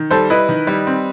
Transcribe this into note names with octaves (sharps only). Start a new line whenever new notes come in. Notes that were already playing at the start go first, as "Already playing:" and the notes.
Already playing: D#3
G3 A4 C5
E4 B4 D#5
D#3
G3
C4